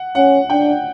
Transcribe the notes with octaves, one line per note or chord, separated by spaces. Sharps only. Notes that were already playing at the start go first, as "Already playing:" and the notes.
Already playing: F#5
C#4 F#5
D4 G5